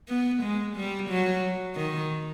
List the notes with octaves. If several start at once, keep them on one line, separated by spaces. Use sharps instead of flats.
B3
G#3
G3
F#3
D#3